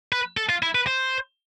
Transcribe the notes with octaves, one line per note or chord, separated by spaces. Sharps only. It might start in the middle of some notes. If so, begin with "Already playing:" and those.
B4
A4
F4
E4
B4
C5